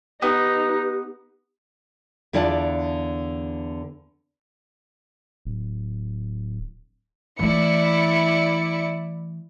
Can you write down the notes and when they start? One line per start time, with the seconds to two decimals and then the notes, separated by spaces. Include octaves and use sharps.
0.22 B3 D#4 G4 B4
2.33 E2 D3 E4 F4 D5 A5
5.45 D1
7.39 E3 A3 E4 D5 C#7